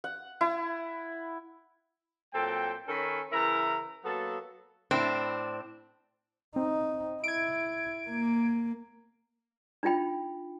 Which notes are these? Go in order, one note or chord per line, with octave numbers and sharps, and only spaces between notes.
F#5
E4
A#2 F#3 C4 A4 G5
D#3 C#4 A4 A#4 G#5 B5
C#3 E3 E4 A#4 A#5
F#3 A#3 B3 A4
A2 C4 D4
C4 D#4
E4 G#6 D7
A#3
D4 D#4 F4 G5 B5